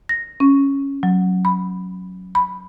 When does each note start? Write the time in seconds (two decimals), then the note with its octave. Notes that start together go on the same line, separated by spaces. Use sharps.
0.09 A#6
0.40 C#4
1.03 F#3
1.45 B5
2.35 B5